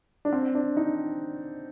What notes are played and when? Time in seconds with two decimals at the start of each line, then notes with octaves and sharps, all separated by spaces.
0.25 D4
0.33 C4
0.55 D4
0.77 D#4